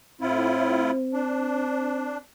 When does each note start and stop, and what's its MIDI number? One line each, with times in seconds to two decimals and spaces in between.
0.21 0.91 45
0.21 2.20 60
0.21 0.91 64
0.21 0.91 65
1.13 2.17 62